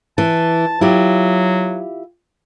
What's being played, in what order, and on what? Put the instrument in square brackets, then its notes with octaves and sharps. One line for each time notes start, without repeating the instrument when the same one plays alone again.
[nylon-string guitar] E3 [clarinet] A5
[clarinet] F#3 [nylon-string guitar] E4 F4 G4